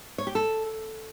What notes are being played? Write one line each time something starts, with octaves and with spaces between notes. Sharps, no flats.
C#5
G4
A4